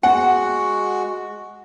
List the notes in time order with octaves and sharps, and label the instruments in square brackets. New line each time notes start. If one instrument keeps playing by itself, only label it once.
[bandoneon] G#3 F#4 [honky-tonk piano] F#5